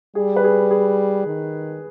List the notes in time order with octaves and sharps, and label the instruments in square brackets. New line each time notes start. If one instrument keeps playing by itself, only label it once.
[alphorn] G3 [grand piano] G#4
[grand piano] B4
G#4
G#4
[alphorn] D#3